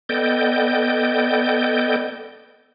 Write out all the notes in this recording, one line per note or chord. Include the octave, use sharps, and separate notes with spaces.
B3 A4 D5 D#5 G5 G6